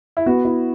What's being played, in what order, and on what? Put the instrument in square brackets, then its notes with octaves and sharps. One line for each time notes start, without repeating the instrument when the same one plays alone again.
[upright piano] E4
[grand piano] B3 [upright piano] F#4
[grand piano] E4